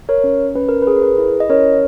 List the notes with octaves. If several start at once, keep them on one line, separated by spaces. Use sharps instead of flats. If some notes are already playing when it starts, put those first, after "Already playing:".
A#4 C#5
C#4
C#4 B4
A#4
G#4 B4
A#4
B4
E4
D#5
C#4 A#4 C#5